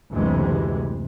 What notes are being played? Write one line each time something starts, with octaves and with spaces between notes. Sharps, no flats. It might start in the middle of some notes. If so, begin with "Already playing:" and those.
F#1 D2 C3 E3 G#3